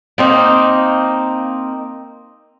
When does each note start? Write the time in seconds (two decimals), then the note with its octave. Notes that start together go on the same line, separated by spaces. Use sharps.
0.18 A#3 C4 D#4